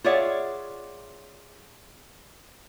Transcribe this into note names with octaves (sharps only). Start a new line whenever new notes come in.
F4 G#4 C#5 D5 E5 F#5